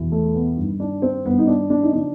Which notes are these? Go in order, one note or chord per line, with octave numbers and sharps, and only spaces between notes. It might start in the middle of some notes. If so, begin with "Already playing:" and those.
Already playing: E2 B2
A3
B3
G2
D#3
D4
C4
G2 D#3 B3
D#4
D4
D4
D#4
C#3 F3 D4